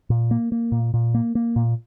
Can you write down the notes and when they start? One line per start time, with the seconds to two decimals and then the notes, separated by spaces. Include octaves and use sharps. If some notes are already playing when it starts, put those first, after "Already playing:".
0.10 A#2
0.31 A#3
0.52 A#3
0.72 A#2
0.94 A#2
1.14 A#3
1.35 A#3
1.56 A#2